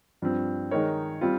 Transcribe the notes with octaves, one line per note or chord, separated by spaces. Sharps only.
G2 F3 C4
D#3 G#3 D#4 A#4 C#5
G3 C4 F4